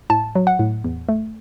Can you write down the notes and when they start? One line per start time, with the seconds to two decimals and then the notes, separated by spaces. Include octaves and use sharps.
0.10 A2 A5
0.35 F#3
0.47 F#5
0.59 A2
0.84 E2
1.09 A3